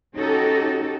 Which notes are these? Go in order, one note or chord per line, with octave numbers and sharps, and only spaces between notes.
C#4 D#4 F#4 G4 A4